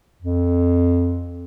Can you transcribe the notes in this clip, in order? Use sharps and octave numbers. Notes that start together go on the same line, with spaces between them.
F2